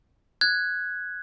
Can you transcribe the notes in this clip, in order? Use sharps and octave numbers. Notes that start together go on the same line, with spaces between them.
F#6 G#6